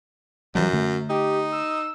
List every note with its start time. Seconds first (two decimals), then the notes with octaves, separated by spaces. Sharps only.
0.55 F#2 E3 F#3 G3
0.73 D3 A3
1.09 D#4 G4
1.52 E6